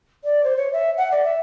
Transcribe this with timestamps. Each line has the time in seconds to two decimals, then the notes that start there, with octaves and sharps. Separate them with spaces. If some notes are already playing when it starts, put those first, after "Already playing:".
0.24 D5
0.43 C5
0.56 C#5
0.72 E5
0.97 F#5
1.11 D5
1.23 E5